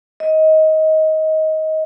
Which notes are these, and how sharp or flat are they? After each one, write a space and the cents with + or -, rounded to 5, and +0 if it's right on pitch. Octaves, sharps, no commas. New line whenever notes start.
D#5 +20